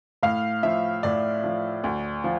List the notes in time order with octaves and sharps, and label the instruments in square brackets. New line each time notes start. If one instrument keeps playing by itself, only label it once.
[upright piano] A2 F5
F3 E5
A2 D5
F3
D2
F3